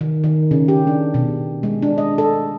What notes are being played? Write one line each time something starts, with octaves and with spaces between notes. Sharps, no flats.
D#3
D#3
C#3
G4
D4
B2
G#3
D4
D#5
A4